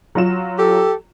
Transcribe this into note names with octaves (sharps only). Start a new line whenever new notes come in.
F#3 F4 E7
G4 A4